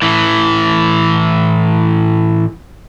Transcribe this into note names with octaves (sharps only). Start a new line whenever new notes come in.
A2 E3